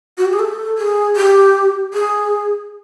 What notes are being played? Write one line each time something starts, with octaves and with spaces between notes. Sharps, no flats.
F#4
G4
G#4
A4
G#4
G4
G#4